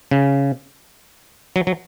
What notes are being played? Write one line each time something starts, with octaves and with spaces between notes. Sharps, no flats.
C#3
F#3
F#3